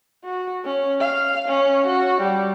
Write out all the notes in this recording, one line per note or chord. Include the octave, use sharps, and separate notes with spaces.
F#4
C#4
F5
C#4
F#4
G3